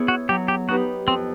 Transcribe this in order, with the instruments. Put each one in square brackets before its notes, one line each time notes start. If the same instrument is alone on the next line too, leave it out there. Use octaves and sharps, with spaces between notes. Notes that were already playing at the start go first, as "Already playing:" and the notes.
Already playing: [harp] B3 E4 G#4 C#5
[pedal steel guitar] F#4
[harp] F#3 [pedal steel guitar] G4
[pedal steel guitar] G4
[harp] B3 D#4 G4 B4 [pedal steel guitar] F#4
[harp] F2 [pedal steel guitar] C4